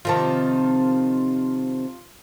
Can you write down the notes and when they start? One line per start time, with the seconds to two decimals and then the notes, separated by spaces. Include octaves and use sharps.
0.05 C3 D#3 F3 F4 A5